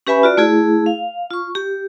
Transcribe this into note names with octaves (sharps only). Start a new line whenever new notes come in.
C#4 G4 B4 E5 G#5 B5
F4 F#4 D5
A3 E4 G#4
F5
F4 C#6
G4